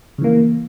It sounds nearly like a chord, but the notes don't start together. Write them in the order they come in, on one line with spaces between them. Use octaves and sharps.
C#3 E3 A#3